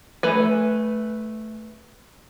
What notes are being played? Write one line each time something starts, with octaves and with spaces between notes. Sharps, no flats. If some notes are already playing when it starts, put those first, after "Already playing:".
A3 B4 G#5